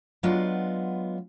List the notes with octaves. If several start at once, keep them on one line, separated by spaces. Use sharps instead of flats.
F#3 G#3 B3 D4 F4